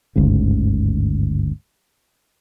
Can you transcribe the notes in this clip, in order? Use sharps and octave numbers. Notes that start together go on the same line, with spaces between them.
G1 D2 G#2 C#3